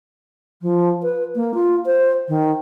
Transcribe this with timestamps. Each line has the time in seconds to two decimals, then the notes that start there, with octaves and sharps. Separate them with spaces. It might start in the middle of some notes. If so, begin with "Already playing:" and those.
0.62 F3
1.03 B4
1.35 A#3
1.54 F4
1.86 C5
2.28 D#3